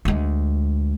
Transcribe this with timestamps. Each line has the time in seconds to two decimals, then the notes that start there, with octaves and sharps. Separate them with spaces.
0.05 D2 G#3